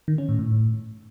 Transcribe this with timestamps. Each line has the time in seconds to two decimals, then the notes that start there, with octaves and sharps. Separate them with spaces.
0.08 D#3
0.18 C#4
0.29 A2
0.39 A2